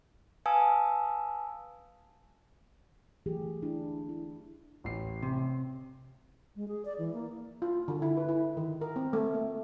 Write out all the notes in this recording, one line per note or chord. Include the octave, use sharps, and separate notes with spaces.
B4 F5 G#5 A5 D#6 E6
E3 F#3 A3 G4 G#4
D4 E4
E4
A1 C7
C3
G#3
G#4
D5
E3
A#3
F4
D3
E4
B4
E4
D#3
A#4
C4
A3
A#3